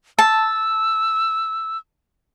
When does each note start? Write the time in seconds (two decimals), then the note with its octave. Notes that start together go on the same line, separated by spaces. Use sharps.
0.19 A5 E6